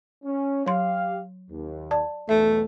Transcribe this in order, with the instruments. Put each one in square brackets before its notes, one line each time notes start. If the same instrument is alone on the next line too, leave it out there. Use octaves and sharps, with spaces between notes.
[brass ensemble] C#4
[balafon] F#3 C6 [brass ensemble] G4 F5
[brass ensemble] D#2
[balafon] D5 A5
[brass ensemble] B1 E2 [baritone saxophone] A3 [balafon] E5